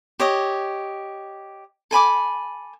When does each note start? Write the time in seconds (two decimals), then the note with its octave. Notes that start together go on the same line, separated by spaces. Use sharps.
0.20 G4 C#5 D#5
1.91 A4 G#5 B5 D6